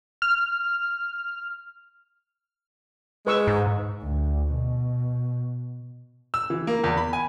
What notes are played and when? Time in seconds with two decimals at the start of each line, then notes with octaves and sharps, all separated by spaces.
0.22 F6
3.27 G#3 B4 C#6 E6
3.47 G#2
4.03 D2
4.53 B2
6.34 E6
6.50 E3
6.67 A#3
6.84 E2
6.97 B5
7.13 G#5